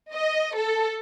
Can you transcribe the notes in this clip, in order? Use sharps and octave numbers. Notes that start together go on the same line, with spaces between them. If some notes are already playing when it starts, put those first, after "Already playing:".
D#5
A4